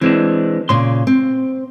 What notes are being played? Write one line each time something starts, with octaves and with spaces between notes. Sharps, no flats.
E3 G#3 C4 D4
A#2 C#3 C6
C4